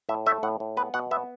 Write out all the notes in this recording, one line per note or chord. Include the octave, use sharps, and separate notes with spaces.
A2 E5
A3 E5
A2 F#5
A2
B3 B4
B2 F#5
B3 E5